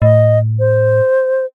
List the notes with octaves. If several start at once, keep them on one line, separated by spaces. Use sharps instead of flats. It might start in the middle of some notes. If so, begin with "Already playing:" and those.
A2 D#5
C5